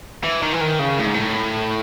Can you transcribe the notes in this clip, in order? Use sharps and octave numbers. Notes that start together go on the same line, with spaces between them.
E3
D#3
E3
D#3
C#3
A2
G#2
A2